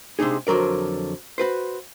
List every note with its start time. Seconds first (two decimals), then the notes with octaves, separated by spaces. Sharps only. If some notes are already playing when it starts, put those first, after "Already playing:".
0.19 C3 G#3 D4 D#4 G#4
0.47 F2 D3 F#3 A#4 D5
1.38 F#4 B4 C5